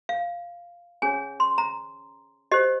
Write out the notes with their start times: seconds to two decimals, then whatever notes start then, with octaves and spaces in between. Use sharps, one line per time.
0.09 F5
1.02 C#4 G#4 C#5 G#5
1.40 C6
1.58 A#5
2.52 G4 C5 D#5